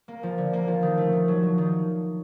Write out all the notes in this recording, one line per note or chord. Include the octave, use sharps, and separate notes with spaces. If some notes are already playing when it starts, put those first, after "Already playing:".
A#3
F3
D3
A#3
F3
D#3
A3
D#3
F#3
F#3
D#3